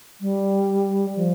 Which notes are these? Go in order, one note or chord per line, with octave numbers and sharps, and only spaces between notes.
G3
F3